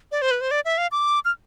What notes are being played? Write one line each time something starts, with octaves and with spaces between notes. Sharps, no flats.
D5
C5
B4
C5
D5
E5
F5
D6
F6